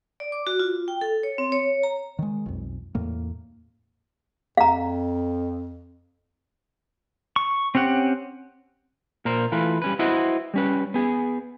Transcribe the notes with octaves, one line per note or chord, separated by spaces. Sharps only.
D5
D6
F#4
F4
G5
A4
C#5
C4
C#5
A#5
D#3 G#3
B1 F2
E2 A2 A#3
F2 F5 A#5
C#6
C4 C#4 G4 F#5
A#2 A#4 C5
E3 A3 F4 B4
G3 C#4 B4
E4 F#4 B4 C5 D#5
G3 C#4 B4
B3 G#4